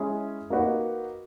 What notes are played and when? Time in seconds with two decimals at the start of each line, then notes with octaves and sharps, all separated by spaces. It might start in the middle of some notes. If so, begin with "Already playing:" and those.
Already playing: G#3 C#4 E4 G#4
0.50 A#3 D#4 F#4 B4